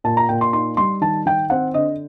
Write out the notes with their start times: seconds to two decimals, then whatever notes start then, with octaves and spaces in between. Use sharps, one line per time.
0.04 A#2 A5
0.17 A#5
0.29 A#2 G5
0.41 C6
0.53 D#4 C6
0.77 G3 C6
1.01 D#3 A5
1.26 D#3 G5
1.50 C4 F#5
1.74 D3 D#5